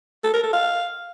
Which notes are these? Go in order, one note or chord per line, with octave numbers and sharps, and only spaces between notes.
A4
A#4
A4
F5